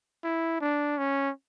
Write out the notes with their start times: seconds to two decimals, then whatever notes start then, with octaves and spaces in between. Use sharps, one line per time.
0.24 E4
0.61 D4
0.98 C#4